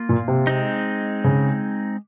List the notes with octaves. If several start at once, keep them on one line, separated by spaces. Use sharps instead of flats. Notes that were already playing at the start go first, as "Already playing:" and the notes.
Already playing: A#3 F4
A#2
C3
G#3 C4 D#4
C#3